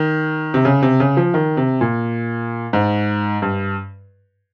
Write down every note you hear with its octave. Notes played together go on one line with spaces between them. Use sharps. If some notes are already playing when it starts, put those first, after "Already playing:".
Already playing: D#3
C3
C#3
C3
C#3
F3
D#3
C3
A#2
G#2
G2